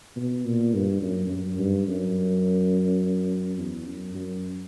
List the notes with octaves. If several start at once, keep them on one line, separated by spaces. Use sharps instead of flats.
B2
A#2
G2
F#2
F#2
G2
F#2
E2
F#2
F#2